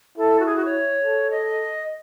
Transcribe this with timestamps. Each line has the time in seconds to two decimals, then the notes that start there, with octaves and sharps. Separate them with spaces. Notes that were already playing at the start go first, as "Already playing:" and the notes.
0.17 E4 A4
0.40 F#4
0.46 G#4
0.56 F#4
0.65 C#5
1.02 A4
1.31 D#5